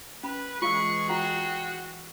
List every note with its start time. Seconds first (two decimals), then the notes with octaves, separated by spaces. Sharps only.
0.23 C#4 B4 B5
0.62 E3 G#3 F4 G#4 F5 C#6 E6
1.09 F4 F#4 F#5 G5 A#5